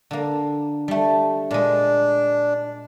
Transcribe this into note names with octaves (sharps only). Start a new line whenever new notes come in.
D3 A#3
G3 A3
A#2 G#3 D4